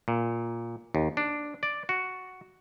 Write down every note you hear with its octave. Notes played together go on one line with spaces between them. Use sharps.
A#2
D#2
D4
D5
F#4